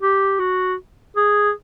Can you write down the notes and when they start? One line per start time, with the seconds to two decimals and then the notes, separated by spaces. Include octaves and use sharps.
0.02 G4
0.40 F#4
1.16 G#4